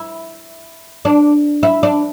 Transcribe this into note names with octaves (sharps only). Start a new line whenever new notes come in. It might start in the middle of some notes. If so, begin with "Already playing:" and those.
Already playing: E4
D4
E4
D4